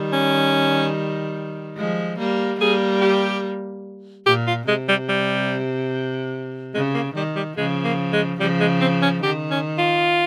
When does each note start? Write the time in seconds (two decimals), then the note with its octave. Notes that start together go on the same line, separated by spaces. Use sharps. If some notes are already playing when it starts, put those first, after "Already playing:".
Already playing: D#3 G3
0.13 C#4
1.77 F3 G#3
2.19 G3 A#3
2.60 G3 A#3 G#4
3.01 G4
4.26 A#2 G4
4.47 F4
4.67 C3 G#3
4.89 G3
5.09 G3
6.74 C#3 G#3
6.94 A#3
7.15 D#3 G3
7.36 G3
7.57 C#3 F3 G#3
7.84 A#3
8.13 G#3
8.40 C#3 F3 G3
8.60 G#3
8.81 C4
9.02 C#4
9.22 D#3 G4
9.51 C#4
9.78 F4